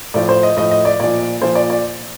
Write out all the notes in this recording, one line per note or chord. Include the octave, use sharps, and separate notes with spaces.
A2 F3 D5
C5
D#5
A2 F3 D#5
D#5
D5
A#2 F3 D5
A#2 F3 C5
D5
D5